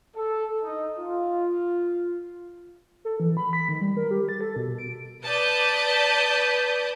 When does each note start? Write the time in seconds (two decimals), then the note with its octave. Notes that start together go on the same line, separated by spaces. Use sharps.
0.16 A4
0.62 D#4
0.99 F4
3.05 A4
3.20 E3
3.37 B5
3.53 B6
3.69 D#3
3.81 G3
3.97 A#4
4.11 G4
4.29 A6
4.41 A4
4.56 B2
4.79 D7
5.25 B4 D5 A5 D#6 G6